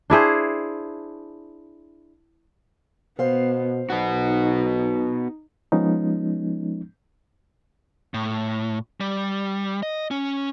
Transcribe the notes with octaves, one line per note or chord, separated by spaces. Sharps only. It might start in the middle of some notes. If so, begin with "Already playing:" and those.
D4 E4 G#4 C5
B2 B3 C5 F5
B1 B3 D#4 F#4
F3 G#3 B3 C#4 D#4
A2
G3
D#5
C#4